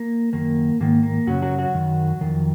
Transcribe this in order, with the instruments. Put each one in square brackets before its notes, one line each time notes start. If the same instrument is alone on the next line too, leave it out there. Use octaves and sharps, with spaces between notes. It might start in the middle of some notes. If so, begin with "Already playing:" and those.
Already playing: [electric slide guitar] A#3
F#2 D#3 A#3
G#2 D#3 A#3
A#3
F#2 C#3 F#3 F#4
F#3 F#4
F#3 F#4
F#2 D#3
F2 D#3